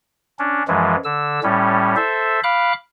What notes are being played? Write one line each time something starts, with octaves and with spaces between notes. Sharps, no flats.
C#4 D4
F#2 E3 F3 G#3
D3 E6
A2 G3 C#4
A4 C5 E5
F5 B5 D6 F#6